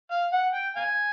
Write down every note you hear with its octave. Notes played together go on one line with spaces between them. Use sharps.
F5
F#5
G5
F5 G#5